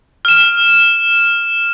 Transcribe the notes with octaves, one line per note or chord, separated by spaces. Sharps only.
F6 E7